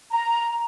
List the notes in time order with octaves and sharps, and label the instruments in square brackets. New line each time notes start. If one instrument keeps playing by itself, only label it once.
[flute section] A#5